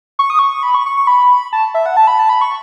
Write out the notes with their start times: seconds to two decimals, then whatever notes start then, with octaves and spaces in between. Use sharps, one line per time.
0.19 C#6
0.30 D#6
0.39 C#6
0.63 B5
0.75 C#6
0.86 C#6
0.97 C#6
1.07 B5
1.53 A5
1.74 E5
1.86 F#5
1.97 A5
2.07 B5
2.19 A5
2.29 B5
2.41 C#6